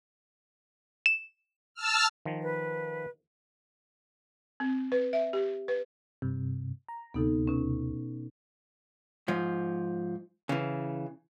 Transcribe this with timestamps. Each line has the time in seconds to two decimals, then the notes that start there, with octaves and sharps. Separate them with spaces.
1.06 E7
1.74 A5 E6 F6
2.26 D#3 F3
2.42 B4
4.60 C4
4.92 B4
5.13 E5
5.33 G4
5.68 B4
6.22 G2 C3
6.89 A#5
7.14 D2 C3 B3 D#4 A4
7.48 B2 C#4
9.28 G#2 F3
10.49 C#3 E3